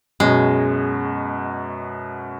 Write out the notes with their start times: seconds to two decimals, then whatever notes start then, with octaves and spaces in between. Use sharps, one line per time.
0.20 F#2 B2 G#3